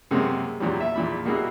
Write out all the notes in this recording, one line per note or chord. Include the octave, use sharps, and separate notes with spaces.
F#2 C3 G#3 A#3
E2 A#2 F#3 G3
E5
E2 A#2 B5
B2 G3 A#3 E4 F#4 G#4